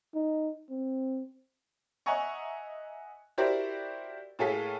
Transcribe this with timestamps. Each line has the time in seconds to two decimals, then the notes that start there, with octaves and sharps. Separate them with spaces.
0.15 D#4
0.70 C4
2.06 D#5 E5 F#5 G#5 A#5 C#6
3.38 E4 F#4 G4 A#4 C5 D5
4.39 A2 A#3 G#4 A4 F5 B6